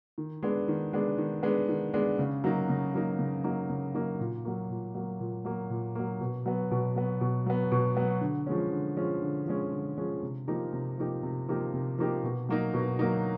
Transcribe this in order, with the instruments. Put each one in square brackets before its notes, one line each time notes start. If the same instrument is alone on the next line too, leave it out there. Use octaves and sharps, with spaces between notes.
[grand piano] D#3
G#3 B3 D4
D#3
G#3 B3 D4
D#3
G#3 B3 D4
D#3
G#3 B3 D4
C#3
F#3 A#3 D#4
C#3
F#3 A#3 D#4
C#3
F#3 A#3 D#4
C#3
F#3 A#3 D#4
A#2
F#3 A#3
A#2
F#3 A#3
A#2
F#3 A#3
A#2
F#3 A#3
B2
F#3 B3
B2
F#3 B3
B2
F#3 B3
B2
F#3 B3
D3
F3 G#3 C#4
D3
F3 G#3 C#4
D3
F3 G#3 C#4
D3
F3 G#3 C#4
C3
F3 A#3 D#4 G4
C3
F3 A#3 D#4 G4
C3
F3 A#3 D#4 G4
C3
F3 A#3 D#4 G4
B2
F#3 A#3 D#4
B2
F#3 A#3 D#4